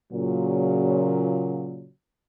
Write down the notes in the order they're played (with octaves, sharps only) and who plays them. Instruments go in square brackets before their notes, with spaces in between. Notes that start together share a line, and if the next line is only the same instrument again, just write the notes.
[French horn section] A#2 C#3 F#3